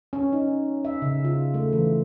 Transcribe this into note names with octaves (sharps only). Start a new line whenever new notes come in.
C#4
D#4
E5
C#3
F4
A3
E3